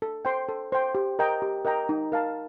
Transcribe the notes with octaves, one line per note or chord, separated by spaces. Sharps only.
A4
C5 G5 C6
A4
C5 G5 C6
G4
A#4 D#5 G5 A#5
G4
A#4 D#5 G5 A#5
D#4
A#4 F5 A5